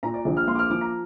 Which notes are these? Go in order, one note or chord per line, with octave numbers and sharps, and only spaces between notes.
A#2 A#5
D5
A#1 D5
F6
A#3 C6
D6
F6
F3 D6
A#5